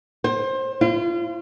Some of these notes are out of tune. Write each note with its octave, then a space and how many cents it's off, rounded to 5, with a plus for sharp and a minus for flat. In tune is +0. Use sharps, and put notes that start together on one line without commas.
C5 +25
F4 -30